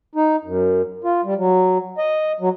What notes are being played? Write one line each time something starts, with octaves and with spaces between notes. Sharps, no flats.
D#4
F#2
F4
G3
F#3
D#5
F#3